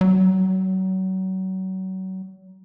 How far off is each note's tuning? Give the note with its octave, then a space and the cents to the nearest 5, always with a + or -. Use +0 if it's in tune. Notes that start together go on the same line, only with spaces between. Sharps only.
F#3 +30